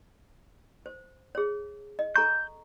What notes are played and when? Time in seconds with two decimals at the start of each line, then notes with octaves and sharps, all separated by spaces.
0.86 C5
1.35 G#4 C#5
1.99 D#5
2.16 A4 A#5 C#6 G6